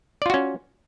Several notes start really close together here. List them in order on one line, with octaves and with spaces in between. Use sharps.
D5 F4 F#4 C#4